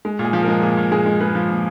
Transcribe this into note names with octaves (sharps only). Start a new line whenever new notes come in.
G#3
A#2
G#4
F3
G#3 A#4
A#2 G#4
A#2
G#3 G#4
G#3
G#3 B4
F3
A#2